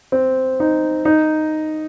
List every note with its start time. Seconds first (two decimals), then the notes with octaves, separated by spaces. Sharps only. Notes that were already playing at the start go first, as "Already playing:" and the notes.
0.12 C4
0.60 D#4
1.05 D#4